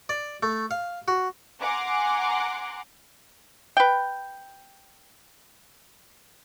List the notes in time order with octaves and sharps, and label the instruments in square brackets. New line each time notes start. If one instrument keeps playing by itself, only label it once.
[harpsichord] D5
A3
F5
F#4
[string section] F#5 G#5 A#5 C6 D6
[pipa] B4 G5